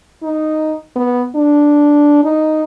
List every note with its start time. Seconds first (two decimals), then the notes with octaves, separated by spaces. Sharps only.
0.23 D#4
0.96 B3
1.36 D4
2.24 D#4